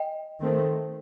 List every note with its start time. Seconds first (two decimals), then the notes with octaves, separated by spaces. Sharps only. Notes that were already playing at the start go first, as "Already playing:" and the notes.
Already playing: D#5 G5
0.40 D#3 A3 C4